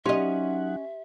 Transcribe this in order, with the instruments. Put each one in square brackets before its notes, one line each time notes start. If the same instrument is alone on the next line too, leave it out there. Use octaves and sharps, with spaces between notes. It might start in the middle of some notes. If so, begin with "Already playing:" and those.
[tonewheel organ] F#3 D#4 F#5 [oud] C#4 D#5 [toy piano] G4 C6 [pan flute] E5